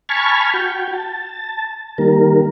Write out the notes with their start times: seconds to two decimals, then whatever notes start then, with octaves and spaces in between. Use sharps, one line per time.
0.09 G#5 A5 B5 C#6 F6 G#6
0.54 F#4 G5
0.93 A5
1.98 D#3 G3 A#3 A#4